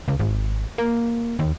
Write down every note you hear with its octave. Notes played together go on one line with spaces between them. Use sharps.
C#2
G#1
A#3
D#2